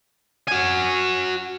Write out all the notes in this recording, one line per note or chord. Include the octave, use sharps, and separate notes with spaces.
F#4 G#5